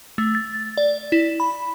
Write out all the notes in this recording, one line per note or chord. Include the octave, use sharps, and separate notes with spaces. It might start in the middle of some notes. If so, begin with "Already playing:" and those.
A3
A6
D5
E4
B5